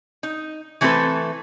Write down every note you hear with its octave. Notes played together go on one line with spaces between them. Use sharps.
D#4
E3 A3 C4 G#4 A4 B4